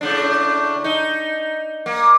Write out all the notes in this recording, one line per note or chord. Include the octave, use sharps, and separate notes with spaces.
A2 C#3 D4
D#4
A#3